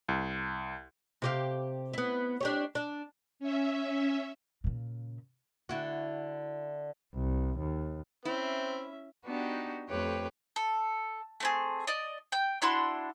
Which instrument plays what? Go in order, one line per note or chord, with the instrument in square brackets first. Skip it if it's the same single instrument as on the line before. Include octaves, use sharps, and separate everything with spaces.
[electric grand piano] C2
[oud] C3 G4 F5
B3 E4
D4 G4 C#5
D4
[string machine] C#4 E5
[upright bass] A#2 C#3
[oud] D3 E4 F#4
[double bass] C2
D#2
[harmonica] C4 [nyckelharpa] C#4 E5 [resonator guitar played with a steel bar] E4
[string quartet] B3 D4 D#4 F#4 G4
F2 A3 G4 B4 C#5 G5
[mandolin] A4
A3 C4 G#4
D5 D#5
G5 G6
D4 E4 F#4 C6